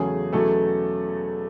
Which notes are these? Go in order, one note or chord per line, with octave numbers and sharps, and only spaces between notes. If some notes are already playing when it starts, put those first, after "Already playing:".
Already playing: E2 C#3 F#3 A3 C#4 G#4
E2 B2 F#3 A3 C#4 A4